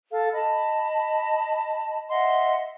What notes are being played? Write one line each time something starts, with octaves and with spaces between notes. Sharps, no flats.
A4 F5
D#5 A5 B5
D#5 E5 F#5 C6